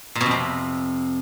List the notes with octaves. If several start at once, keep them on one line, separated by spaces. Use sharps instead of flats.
A#2
B2
F2
C3